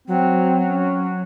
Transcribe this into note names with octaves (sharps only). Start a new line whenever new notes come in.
F#3 C4
C#4